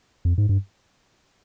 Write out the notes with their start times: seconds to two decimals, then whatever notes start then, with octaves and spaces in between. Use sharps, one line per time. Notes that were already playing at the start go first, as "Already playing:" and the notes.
0.25 F2
0.38 G#2
0.49 G2